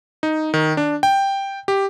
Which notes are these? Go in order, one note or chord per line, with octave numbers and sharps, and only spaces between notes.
D#4
D#3
D4
G5
G4